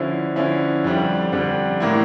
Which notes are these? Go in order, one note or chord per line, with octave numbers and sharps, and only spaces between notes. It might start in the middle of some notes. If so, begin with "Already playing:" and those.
Already playing: D3 F3 C#4 E4
D3 F3 C#4 E4
F2 D3 G3 D4
F2 D3 G3 D4
A2 E3 A#3 E4